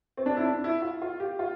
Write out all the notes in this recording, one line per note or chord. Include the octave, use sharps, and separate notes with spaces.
C4
D4
E4
D4
E4
F4
F4
G4
F4